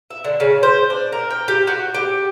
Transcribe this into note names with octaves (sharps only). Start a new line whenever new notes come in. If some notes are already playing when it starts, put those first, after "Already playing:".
E5
D3
C#3
C5
D4
A#4
G5
G4
F#4
G4